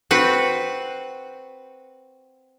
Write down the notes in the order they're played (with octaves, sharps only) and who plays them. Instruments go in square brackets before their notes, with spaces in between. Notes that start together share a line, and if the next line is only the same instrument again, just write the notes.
[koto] C4 F#4 B4